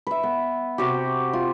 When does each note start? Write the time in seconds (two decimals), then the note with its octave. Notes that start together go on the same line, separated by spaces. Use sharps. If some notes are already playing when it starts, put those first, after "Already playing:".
0.07 B4 E5
0.23 B3
0.78 C3 F#4 G4
1.33 F4